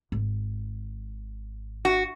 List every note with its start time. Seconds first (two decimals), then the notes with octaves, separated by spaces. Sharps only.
0.12 G#1
1.85 F#4